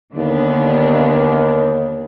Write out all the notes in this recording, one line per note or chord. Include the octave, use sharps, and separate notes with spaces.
D#2 D3 B3 D4